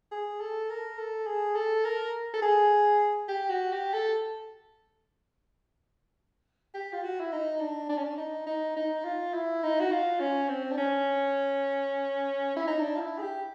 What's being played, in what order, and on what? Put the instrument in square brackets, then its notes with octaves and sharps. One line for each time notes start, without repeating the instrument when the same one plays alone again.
[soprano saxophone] G#4
A4
A#4
A4
G#4
A4
A#4
A4
G#4
G4
F#4
G4
A4
G4
F4
F#4
E4
D#4
D4
D4
C#4
D4
D#4
D#4
D#4
F4
E4
D#4
F#4
F4
C#4
C4
D4
C#4
E4
D#4
D4
F4
E4
G#4
G4